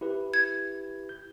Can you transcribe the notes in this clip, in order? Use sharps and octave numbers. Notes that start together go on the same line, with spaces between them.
E4 G4 B4
G#6
G6